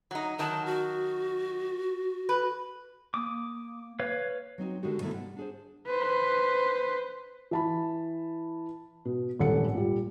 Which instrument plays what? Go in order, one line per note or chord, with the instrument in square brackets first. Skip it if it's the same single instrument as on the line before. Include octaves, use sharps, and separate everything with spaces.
[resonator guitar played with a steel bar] F#3 D#4
[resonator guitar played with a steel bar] D#3 F#3 [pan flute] A5
[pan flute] F#4
[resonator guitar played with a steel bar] B4
[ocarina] A#3 [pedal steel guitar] D6 D#6
[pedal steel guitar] B4 C#5 F5
[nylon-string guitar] F#3 C4 D#4 F#4
D3 D#3 G#3 D#4 F#4 G4
C3 D#3 A3 B3 E4
G3 F#5
D4 G#4 C5
[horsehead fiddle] B4 C5
[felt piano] E3 A5 B5
B2
D#1 G#1 A4 F#5 C#7
A#2 G3